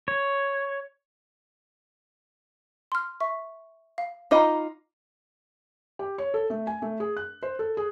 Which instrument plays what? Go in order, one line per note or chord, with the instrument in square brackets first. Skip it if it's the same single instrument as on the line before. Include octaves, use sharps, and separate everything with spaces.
[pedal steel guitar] C#5
[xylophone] C6 F6
E5 C#6
F5
[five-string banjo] D#4 F4 D#5 [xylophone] A#5 B5 D6
[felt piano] G4
C#5
A4
A3
G#5
A3
G#4
F#6
C5
A4
G#4